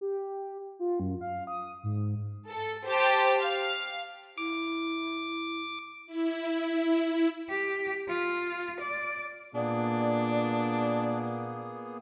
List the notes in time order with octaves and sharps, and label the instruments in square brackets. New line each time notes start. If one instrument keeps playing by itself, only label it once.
[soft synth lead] G4
F4
F#2
F5
D#6
G#2
[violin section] A4
G4 C5 A5
F5
[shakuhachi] E4 [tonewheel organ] D6
[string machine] E4
[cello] G4
F4
D5
[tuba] A#2 [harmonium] A#3 B3 G#4 [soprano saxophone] D4 [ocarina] D5